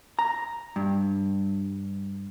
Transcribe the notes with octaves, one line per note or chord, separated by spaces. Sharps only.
A#5
G2